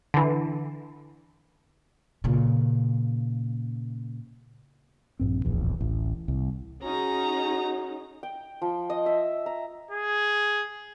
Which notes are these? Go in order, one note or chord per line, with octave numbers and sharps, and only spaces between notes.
D3 E3
A#2 C#3
A#1 G2 C4
D1 A#1 E2
D1 A1
C2
C#4 D#4 F#4 G#4 A#5
G5
F3
D#5
E5
A#5
G#4